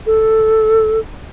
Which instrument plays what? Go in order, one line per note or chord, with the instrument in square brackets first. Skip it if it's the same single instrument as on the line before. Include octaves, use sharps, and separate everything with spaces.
[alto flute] A4